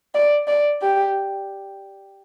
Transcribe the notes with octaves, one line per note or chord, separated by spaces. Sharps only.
D5
D5
G4